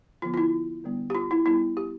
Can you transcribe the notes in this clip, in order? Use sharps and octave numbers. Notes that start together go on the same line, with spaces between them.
D3 F3 B3 F4
F4
E4
D3 G3 B3 D4
G4
F4
E4
G3 B3 E4
G4